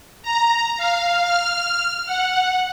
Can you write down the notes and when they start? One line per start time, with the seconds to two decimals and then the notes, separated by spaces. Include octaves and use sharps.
0.23 A#5
0.77 F5
1.23 F6
2.06 F#5